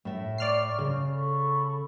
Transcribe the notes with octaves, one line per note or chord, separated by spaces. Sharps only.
A2 E5
D5 C#6 F6 C7
C#3
A4 B5 C#6